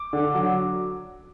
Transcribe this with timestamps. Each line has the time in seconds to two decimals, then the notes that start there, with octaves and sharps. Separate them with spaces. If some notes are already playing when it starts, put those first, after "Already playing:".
Already playing: D6
0.13 D3
0.34 F#3